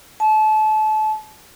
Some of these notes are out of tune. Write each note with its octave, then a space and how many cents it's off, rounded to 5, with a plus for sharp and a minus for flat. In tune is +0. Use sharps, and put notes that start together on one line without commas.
A5 -30